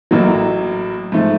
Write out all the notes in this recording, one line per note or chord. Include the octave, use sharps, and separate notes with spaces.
A1 A2 F#3 A#3
G#2 F3 A3